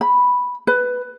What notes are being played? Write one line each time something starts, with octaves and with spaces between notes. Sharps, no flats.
B5
B4